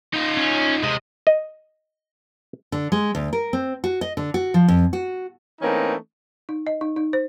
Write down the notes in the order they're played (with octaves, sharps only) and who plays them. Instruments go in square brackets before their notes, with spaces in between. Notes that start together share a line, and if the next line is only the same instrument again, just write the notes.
[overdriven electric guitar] D#4 F4
[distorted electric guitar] C#4
[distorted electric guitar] C3 G#3 [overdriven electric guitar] D#5
[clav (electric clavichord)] D#5
[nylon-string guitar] D3
G#3
D2
A#4
C4
F#4
D#5
D3
F#4
F3
F2
F#4
[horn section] E3 A3 A#3 C4 C#4 D#4
[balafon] D#4
D#5
D#4
D#4
C5